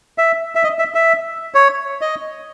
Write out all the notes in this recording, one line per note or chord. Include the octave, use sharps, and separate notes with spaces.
E5
E5
D#5
E5
E5
C#5
D#5